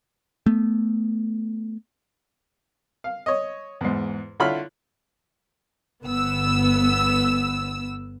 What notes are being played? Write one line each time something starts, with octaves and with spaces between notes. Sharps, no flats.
A3 B3
F5
C#5 D#5
E2 G#2
D3 E4 F4 C#5 B5 F6
G1 B3 E6